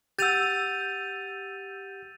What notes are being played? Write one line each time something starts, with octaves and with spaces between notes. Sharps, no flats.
G4 F#5 E6 G6 A6 D#7 F7